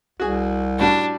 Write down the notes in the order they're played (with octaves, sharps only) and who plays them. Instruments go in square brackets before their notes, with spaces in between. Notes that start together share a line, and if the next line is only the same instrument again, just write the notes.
[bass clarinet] C2 [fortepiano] F#4 G#4
[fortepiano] A2 G3 F#4 [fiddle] D4